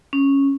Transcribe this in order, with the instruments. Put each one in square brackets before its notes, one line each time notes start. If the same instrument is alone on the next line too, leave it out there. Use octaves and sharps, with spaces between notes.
[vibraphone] C#4